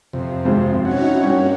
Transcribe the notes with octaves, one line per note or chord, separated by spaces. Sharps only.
F2 C3
G#1 G#2 C5
C#4 D#4 E4 F#4 C#5
G2 A#3 C#5 G5